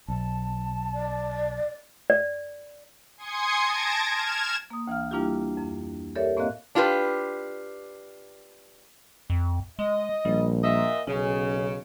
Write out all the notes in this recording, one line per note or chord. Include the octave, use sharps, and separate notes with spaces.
B1 A5
D5
D5
G#5 C6 D#6 G#6 C#7
A5 G#6 A#6 D7
F6 G#6 E7
A#3 D#6
D2 E3 F5 F6
G3 A#3 D4 E4 F4 G4
F2
G4 A4 A#4 C#5 D5 E5
A2 A#3 C4 D#5 F5 F#6
D4 F4 G4 A4 B4
F2
G#3 D#5
A#1 G3
A#2 D#5 E5
B1 C#3 C#4